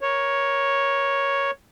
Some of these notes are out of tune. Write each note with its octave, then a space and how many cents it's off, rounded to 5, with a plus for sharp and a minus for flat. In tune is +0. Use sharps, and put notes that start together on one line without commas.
A#4 +20 C#5 +0